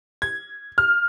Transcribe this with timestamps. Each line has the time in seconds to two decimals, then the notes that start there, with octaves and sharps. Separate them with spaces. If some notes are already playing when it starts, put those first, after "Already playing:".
0.22 G#6
0.78 F6